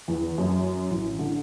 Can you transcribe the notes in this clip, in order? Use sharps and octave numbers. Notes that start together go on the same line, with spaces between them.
E2
F#2
A1
D3